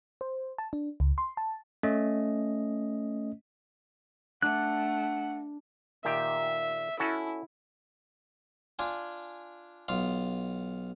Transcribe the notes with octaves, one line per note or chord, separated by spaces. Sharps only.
C5
A5
D4
C#2
C6
A5
A3 C#4 D#5
A3 D4 F#5 F#6
A#2 D#3 G4 E5
C#4 E4 F#4 A4
D4 F4 G#5
B1 F4 F5